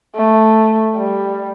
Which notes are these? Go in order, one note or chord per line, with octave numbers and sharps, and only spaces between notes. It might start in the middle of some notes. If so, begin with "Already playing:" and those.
A3
G3